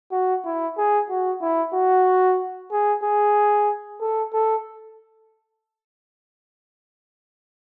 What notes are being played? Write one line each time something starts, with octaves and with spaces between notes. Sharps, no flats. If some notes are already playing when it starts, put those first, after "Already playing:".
F#4
E4
G#4
F#4
E4
F#4
G#4
G#4
A4
A4